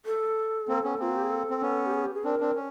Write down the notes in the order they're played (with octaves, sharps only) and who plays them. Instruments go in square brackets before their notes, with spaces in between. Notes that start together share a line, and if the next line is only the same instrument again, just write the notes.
[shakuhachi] A4
[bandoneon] A#3 C4
B3 C#4
[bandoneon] A#3 C4 [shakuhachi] F4
[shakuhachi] F#4
G4
G#4
A4
[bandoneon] C4
B3 C#4
[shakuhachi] G4
G#4
G4
G#4
[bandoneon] C4 D4 [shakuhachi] A#4
[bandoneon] C4 D4
C#4